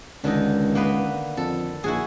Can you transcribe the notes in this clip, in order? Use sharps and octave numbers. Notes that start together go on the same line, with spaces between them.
C#2 D3 D#3 D#4
A#3 B3 B4
F2 A4
A#1 E4 F#4 G#4